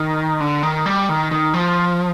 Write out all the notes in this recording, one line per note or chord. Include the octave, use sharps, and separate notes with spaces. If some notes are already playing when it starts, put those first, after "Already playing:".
Already playing: D#3
D3
D#3
G3
D#3
D#3
F3